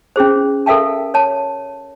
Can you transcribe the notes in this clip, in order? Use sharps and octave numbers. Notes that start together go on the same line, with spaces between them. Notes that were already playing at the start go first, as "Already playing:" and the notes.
C#4 E4 G#4 C5
A4 A#4 E5 F5 G5 A5
C#5 A5